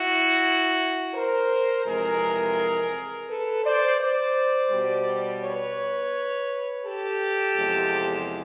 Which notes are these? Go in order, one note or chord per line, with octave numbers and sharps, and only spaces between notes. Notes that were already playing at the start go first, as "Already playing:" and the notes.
Already playing: E4 F#4
A#4 C5
F2 C3 E3 G#3 G#4 A#4
A4 B4
C5 D5
C5 D5
B2 G3
B4 C#5
G4 A4
E2 C3 F3 G#3